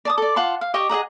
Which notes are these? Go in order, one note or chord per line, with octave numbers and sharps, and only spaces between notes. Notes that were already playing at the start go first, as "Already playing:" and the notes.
D5 A5 D#6
A4 D5
F4 F#5 A5 C6
F5
G4 D#5 C#6
G#4 D#5 F#5 A#5